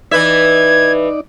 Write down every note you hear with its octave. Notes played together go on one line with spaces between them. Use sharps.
E3 D#4 B4 D5 E5 G#6